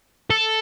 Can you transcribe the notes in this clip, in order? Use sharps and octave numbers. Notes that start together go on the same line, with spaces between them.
A4